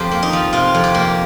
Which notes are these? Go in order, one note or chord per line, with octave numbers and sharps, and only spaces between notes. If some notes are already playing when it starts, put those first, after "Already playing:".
Already playing: F2 F4 G4 A#4 C5
A#3
D#4
F3
C3 F4
F2
G4
A#3